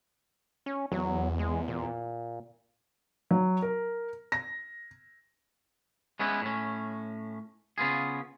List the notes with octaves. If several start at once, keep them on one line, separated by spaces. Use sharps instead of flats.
C#4
E2 F#3
G#3
A#2
F#3
A#4
A#6
G#3 B3 C#4 E4
A2 C#4
C#3 B3 F4 G#4